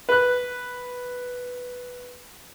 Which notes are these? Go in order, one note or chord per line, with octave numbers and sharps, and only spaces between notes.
B4 F#6